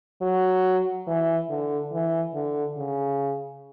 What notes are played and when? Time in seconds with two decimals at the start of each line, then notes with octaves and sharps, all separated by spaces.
0.21 F#3
1.07 E3
1.49 D3
1.92 E3
2.34 D3
2.77 C#3